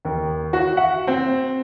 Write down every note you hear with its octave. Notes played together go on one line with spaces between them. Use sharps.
D#2
F#4
F#5
C4